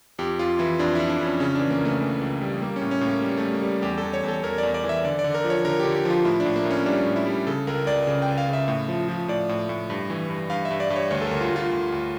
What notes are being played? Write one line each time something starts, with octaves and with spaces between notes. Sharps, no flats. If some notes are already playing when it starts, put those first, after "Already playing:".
F2 G4
F2 F4
E3 E4
F2 D4
F2 E4
D4
F2
C#4
C#3 C#4
E3 D4
A#3
C#2 A3
E3
C#2
G3
G3 A#3
C#4
A2
C#4
A2
A#3
G3
A3
G3
A#3
G3
E2 G4
A4
E2
C#5
E2 A4
E2 A#4
E2 D5
D5
E3
E5
D3 D5
D5
D3
A#4
F3
C#5
D3 A#4
G4
D3
G4
F3 F4
A2 E4
D4
A2
A#3
A2
C#4
G3 D4
A2
E4
G3
C#3 A4
C#2 A#4
C#2 D5
C#3
G5
C#2
F5
C#3 E5
A2
F3
F3
A2 D5
A2
A2
G2
E3
G2
G2 F5
E5
G2
D5
G2
C#5
D2 C#5
A4
A#4
D2
F4
D2
F4
D2
D2